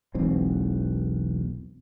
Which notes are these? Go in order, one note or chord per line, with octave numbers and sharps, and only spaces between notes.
E1 B1 E2 C4